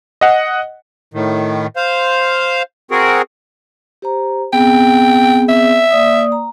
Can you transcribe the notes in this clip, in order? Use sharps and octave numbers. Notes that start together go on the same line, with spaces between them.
D#5 F#5
A2 D#3
C5 F5
C4 F#4 G#4 A#4
G4 C5 A#5
B3 C4 G#4 G5
E5
A#3 D5 D#6
A#5